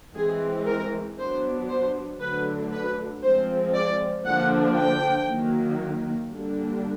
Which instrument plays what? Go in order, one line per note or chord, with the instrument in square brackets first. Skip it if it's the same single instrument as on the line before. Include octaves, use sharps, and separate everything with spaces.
[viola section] E3 G#3 C4 G#4
A#4
F#3 B3 D4 C5
C5
D3 F#3 A3 D4 B4
B4
F3 G#3 C4 C5
D5
D3 F3 A#3 D4 F#5
G5
D#3 F#3 A#3
D3 G3 A#3 D4